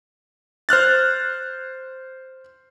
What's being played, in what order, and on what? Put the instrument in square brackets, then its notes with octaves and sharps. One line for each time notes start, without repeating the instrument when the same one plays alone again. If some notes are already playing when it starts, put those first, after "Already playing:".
[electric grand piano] C5 F6 F#6 A6